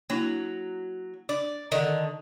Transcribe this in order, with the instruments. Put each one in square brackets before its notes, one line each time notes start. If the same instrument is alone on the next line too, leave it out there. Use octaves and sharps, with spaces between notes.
[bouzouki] F#3 [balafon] A#3 D4 E4
[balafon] D4 [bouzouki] D5
[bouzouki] D3 D#3 [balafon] A4 D5